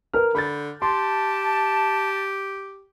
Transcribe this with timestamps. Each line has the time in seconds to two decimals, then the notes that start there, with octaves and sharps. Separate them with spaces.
0.14 A#4 B4 F6
0.35 D3 B5 G6 A6
0.82 G4 A5 C6